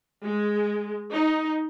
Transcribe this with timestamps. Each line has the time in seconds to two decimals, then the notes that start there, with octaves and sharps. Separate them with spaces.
0.23 G#3
1.12 D#4